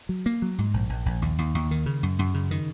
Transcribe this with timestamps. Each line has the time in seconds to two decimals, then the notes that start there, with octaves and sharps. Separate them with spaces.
0.09 F#3
0.26 A#3
0.42 F#3
0.58 G#2
0.74 A#1
0.90 A#1
1.06 A#1
1.22 D#2
1.38 D#2
1.55 D#2
1.71 D#3
1.86 C#3
2.03 F#2
2.19 F#2
2.34 C#3
2.51 D#3